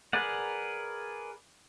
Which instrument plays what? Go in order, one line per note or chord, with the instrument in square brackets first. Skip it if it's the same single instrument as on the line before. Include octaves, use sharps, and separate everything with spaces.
[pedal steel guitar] G#4 A#4 B4 D5 F#5